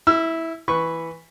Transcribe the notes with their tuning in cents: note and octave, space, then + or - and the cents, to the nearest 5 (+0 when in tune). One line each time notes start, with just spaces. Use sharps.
E4 -10 E6 +30
E3 +0 B4 +0 C#6 +0